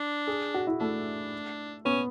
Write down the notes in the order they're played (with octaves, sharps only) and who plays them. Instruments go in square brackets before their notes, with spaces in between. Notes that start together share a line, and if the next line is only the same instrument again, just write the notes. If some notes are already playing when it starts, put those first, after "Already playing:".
Already playing: [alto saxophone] D4
[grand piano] G#4
F#4
E4
[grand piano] A3 [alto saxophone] D4
[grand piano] B3 [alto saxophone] C#4